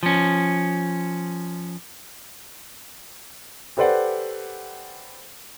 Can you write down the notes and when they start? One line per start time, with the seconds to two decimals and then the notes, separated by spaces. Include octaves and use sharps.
0.03 F3 C#4
3.77 G4 A4 B4 C5 D5 F#5